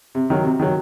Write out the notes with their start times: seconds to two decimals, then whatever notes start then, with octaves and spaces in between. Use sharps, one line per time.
0.15 C3
0.30 D#3 F#3
0.44 C3
0.59 D#3 F#3